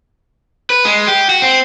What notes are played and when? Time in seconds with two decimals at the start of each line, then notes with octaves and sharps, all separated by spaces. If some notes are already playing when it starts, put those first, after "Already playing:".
0.70 B4
0.85 G#3
1.07 G4
1.29 F#4
1.42 C4